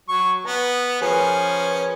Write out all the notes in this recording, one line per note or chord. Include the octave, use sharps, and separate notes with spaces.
F#3 C#6
B3 A#5
F3 C#4 G#4 A#4 B4